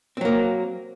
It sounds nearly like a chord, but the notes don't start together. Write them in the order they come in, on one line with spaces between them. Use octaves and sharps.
C4 F#3 A#3